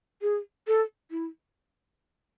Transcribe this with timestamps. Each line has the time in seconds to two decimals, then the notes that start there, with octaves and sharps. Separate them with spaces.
0.22 G#4
0.67 A4
1.11 E4